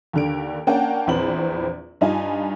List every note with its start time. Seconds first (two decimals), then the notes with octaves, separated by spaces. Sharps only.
0.13 D#2 D3 D7
0.67 A#3 C#4 D4 F#5 G5 A5
1.07 A#1 E2 C4 B4 C5 F#7
2.01 G2 D#4 F4 G#5